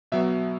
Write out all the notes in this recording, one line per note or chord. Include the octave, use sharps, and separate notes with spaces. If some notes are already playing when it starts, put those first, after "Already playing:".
B2 F#3 B3 E5